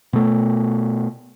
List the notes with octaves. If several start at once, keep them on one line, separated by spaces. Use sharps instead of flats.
B2 A3